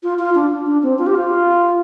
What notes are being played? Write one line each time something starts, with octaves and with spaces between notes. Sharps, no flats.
F4
F4
D4
D4
C4
F4
G4
F4